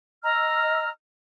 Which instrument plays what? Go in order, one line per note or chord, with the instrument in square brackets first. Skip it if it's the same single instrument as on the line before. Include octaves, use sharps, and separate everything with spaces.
[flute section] D#5 E6 F6 [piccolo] A#5